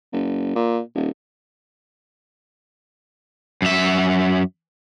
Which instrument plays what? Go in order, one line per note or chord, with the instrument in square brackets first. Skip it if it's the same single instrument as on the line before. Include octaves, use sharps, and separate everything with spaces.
[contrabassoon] F#1
A#2
D#1
[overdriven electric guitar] F#2 E5